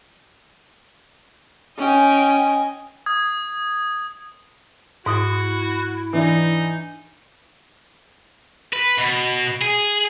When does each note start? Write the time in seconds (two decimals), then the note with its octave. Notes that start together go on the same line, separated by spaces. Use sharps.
1.78 C#4 D#5 G5 G#5
3.06 D#6 G#6
5.06 G#2 E4 F#4 D#6
6.13 E3 D4 D#4
8.73 B4
8.98 B2
9.61 G#4